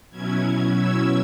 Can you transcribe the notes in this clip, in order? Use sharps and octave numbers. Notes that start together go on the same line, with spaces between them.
B2 F#3 C#4 E4 G#6
E6